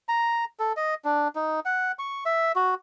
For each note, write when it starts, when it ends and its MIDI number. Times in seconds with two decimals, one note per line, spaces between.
0.09 0.45 82
0.59 0.73 69
0.77 0.95 75
1.05 1.28 62
1.35 1.60 63
1.65 1.92 78
1.99 2.24 85
2.26 2.52 76
2.56 2.75 66